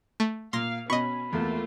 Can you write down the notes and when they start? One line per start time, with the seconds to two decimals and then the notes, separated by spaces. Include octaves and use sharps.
0.20 A3
0.53 A#2 F5 C6 A#6
0.90 B2 C#4 D#5 B5 C#6
1.33 E2 A3 A#3 F4